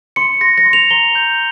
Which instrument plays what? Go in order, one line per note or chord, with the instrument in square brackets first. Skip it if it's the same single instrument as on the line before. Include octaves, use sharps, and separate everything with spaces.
[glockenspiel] C6 C#7
C6 A#6
A#6
C6
F7
A#5 G7
G6